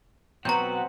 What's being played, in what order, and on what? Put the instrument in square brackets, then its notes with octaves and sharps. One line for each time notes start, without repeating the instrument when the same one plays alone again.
[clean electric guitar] B2 F#3 F#4 [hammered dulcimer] C4 [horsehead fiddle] B4 F#5 [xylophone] A#5 G6